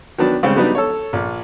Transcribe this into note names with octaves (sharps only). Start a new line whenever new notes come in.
D#3 F#3 B3 D4
C#3 G3 G#3 C4
F#3 G3 B3 D4 D#4
A4 C#5
A#1